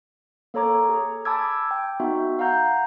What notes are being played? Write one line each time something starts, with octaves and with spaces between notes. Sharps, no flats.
A#3 A4 C#5 A#5 D6 G#6
G#4
G#5 A5 B5 D6 E6 G#6
G5
B3 D#4 F#4 E5
F5 F#5 A#5 G6